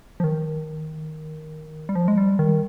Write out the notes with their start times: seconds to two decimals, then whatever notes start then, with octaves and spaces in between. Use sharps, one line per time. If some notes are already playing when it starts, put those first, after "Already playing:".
0.20 F3
0.24 D#3
1.89 G3
1.95 F3
2.08 G#3
2.18 G3
2.39 D#3